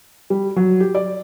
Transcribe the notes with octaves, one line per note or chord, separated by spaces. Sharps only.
G3
F#3
G4
D5